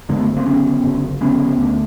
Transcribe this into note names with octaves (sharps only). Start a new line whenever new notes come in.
F#1 F#2 D3 G#3 A#3
A3 B3
A#3 C4
F#1 F#2 D3 B3 C#4
F#1 F#2 D3
F#1 F#2 D3 B3 C#4
D2 D3